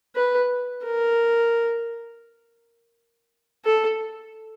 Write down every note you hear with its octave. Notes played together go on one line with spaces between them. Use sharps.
B4
A#4
A4